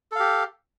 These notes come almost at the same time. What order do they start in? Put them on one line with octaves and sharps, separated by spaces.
A4 F5 G4